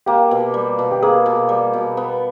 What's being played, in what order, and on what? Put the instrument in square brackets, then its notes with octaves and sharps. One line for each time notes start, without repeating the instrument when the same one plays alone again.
[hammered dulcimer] A#3 [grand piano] G4
[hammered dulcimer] B2
G3
B2
[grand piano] G4
[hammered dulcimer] A#3 [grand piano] G#4
[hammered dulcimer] B2
G3
B2
B3